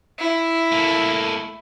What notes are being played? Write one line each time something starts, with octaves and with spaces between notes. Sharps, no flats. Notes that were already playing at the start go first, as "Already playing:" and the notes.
E4
A3 A#3